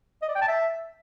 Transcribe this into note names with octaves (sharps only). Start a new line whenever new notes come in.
D#5
D5
G5
A5
E5